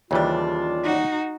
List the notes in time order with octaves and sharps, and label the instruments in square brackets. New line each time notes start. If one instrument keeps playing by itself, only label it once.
[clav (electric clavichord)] D#2 E3 G3 [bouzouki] C#3 D4 [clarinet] F4
[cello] D#4 F#4